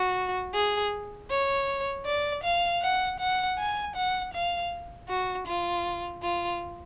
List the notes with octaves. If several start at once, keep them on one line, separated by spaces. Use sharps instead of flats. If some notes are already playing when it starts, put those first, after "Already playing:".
Already playing: F#4
G#4
C#5
D5
F5
F#5
F#5
G#5
F#5
F5
F#4
F4
F4